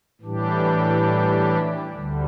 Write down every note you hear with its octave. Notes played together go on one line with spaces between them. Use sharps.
A2 E3 G3 D4 G4
D2 D3 G3